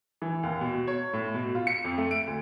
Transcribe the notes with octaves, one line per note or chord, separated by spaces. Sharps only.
E3
D#2
B2
C#5
A2
B2
F4
C#7
F2
A3
D7
D2